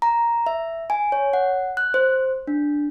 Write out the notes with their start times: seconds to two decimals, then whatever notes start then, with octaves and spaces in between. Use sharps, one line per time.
0.02 A#5
0.46 E5
0.90 G#5
1.12 C#5
1.33 F#5
1.77 F#6
1.94 C5
2.47 D4